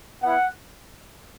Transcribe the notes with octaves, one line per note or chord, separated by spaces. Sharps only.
B3 E4 F#5